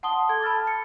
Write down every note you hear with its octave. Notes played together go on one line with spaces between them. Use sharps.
F#5 A5 C6 D#6 G7
A4 G#6
A5 B5 E6 F6 A6
C#7